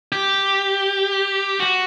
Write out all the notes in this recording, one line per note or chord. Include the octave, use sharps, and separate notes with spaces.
G4
F#4